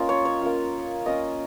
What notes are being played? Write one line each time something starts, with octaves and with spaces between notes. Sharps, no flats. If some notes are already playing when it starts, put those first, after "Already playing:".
Already playing: A#3 C#4 F4 D#5
C#5
C#5
A#3 C#4 F4
A#3 C#4 F4 D#5